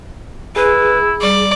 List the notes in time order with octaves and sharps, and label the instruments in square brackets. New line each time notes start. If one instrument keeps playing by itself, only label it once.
[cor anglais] E4 [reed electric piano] G#4 [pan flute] B4
[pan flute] G3 [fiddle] D5